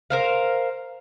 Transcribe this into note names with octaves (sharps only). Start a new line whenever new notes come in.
A#4 C5 F5